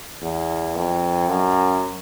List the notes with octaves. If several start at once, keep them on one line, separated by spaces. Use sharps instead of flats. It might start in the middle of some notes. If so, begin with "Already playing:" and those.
E2
F2
F#2